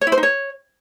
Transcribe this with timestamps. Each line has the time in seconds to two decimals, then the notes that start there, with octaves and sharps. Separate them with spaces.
0.01 C#5
0.07 E4
0.12 C5
0.18 D#4
0.23 C#5